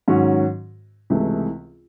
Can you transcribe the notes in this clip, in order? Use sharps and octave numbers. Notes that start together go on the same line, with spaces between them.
G#2 D#3 F#3 C#4 F#4
C#2 C3 E3 A3